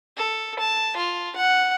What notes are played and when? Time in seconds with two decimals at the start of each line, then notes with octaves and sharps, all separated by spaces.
0.17 A4
0.59 A5
0.96 F4
1.36 F#5